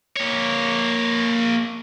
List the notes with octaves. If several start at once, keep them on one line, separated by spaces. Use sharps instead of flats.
A#3 C#5